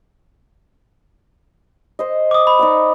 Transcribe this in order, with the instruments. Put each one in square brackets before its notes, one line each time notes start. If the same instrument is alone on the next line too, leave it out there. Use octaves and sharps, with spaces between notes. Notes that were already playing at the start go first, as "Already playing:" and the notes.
[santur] C5 D#5
[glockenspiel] D6 D#6
B5
[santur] D#4 D5 F#5